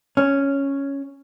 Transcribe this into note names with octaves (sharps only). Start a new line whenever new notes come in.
C#4